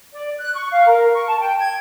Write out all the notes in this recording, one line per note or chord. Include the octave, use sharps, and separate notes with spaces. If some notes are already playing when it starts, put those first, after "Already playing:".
D5
F#6
C#6
F5
A#4
C#6
A5
G5
G#6